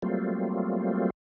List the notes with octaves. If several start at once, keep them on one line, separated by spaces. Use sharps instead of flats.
F#3 G3 A3 A#3 C4 F4